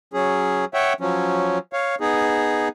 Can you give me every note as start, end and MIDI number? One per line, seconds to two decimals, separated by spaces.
0.14 0.65 54
0.14 0.65 61
0.14 0.65 68
0.74 0.93 73
0.74 0.93 76
0.74 0.93 78
0.74 0.93 79
1.01 1.58 53
1.01 1.58 54
1.01 1.58 61
1.73 1.95 73
1.73 1.95 77
2.01 2.68 59
2.01 2.68 63
2.01 2.68 68